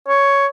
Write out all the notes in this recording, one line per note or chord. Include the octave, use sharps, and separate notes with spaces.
C#5